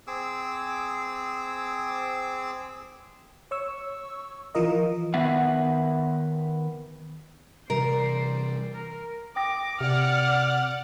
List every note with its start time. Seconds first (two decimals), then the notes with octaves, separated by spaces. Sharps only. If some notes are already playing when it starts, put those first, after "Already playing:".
0.07 C4 G#4 D6 E6
3.51 C#5 C#6 E6
4.55 E3 F3 F4 A#4 D#5
5.14 D#3 B3 E5 F#5
7.70 C3 E3 G3 A#4 C5 D5
8.72 A#4
9.36 G5 D6 D#6 A#6
9.81 C3 D5 F#5 F6